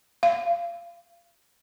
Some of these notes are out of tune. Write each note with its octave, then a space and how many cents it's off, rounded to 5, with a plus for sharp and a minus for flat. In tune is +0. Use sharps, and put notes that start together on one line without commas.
F5 -25